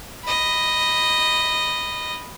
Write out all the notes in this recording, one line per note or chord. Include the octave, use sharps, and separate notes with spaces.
D#5 B5